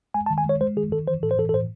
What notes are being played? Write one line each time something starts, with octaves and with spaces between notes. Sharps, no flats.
G#3 G#5
A5
D#3
G#5
G#3 C#5
G#3 C5
D#3 G#4
D#3 A4
E3 C5
A2 A4
C5
E3 A4
A4
A2 C5